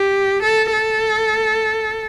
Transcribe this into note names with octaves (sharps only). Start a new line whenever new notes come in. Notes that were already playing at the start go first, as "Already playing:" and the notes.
Already playing: G4
A4
A4